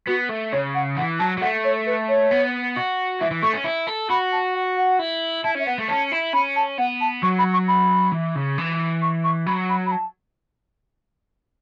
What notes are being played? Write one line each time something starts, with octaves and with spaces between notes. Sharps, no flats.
B3 F#4
A3
C#3 C#5
F#5
E3 F#5
F#3 A5
F#3
A3 F#5
C#5
B4
C#5
B3
F#4
E3 E5
E3
A3 C#6
C#4
E4
A4
F#4 B5
A5
F#5
F#5
E4
E4 A5
C#4 E5
B3 F#5
A3
C#4 A5
E4
C#4 B5
A5
B3 F#5
A5
F#3 C#6
B5
C#6
B5
E3
C#3
E3
C#6
C#6
F#3 B5
B5
B5
A5